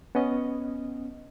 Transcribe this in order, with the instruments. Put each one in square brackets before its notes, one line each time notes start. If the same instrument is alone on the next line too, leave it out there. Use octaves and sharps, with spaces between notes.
[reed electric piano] B3 C#4 D#5